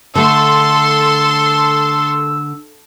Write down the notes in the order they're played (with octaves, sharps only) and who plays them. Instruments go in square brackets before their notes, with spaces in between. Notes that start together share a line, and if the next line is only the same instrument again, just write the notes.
[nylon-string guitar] D3 A3 [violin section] A4 C6 [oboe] E6